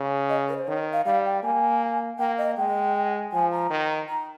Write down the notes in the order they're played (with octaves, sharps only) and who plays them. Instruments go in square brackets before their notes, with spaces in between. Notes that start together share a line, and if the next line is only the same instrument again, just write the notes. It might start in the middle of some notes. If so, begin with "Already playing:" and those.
Already playing: [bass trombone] C#3
[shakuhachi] D#5
A#4
C#5
C5
[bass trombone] D#3 [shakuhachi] C#5
[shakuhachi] F5
[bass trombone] G3 [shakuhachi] F5
[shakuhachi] G5
[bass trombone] A#3 [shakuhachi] G#5
[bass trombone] A#3 [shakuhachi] G5
[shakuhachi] D#5
[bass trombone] G#3 [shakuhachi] G5
[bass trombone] F3 [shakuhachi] G#5
[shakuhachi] A#5
[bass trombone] D#3
[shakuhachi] A#5